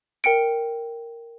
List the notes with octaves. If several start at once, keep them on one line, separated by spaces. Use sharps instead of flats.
A#4 G5 C#7 D7